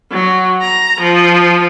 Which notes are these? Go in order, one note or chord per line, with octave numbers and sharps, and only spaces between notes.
F#3
A#5
F3